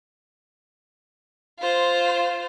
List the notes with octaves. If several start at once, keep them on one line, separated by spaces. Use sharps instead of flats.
F4 C5